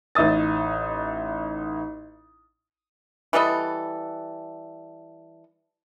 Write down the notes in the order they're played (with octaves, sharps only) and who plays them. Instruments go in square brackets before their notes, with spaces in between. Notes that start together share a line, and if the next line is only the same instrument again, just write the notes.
[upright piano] A1 D#4 E5 D#6 A6
[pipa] E3 G3 A4 D#5